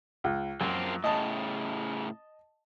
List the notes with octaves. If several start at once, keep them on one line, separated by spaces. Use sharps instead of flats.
C#2
F#2 F3 A#3 C4
A2 C#3 D#5 A5